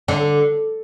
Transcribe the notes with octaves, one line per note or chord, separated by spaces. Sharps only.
D3